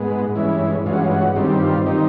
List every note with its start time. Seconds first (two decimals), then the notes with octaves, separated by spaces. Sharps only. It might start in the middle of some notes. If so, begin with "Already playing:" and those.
Already playing: G#2 G#3 B3
0.35 G2 E3 G#3 C#4 E4
0.86 G2 E3 G#3 C#4 F4
0.93 F#4
1.00 F4
1.11 F#4
1.36 G2 D#3 G3 C4
1.61 F4
1.86 D#3 G3 C4 D#4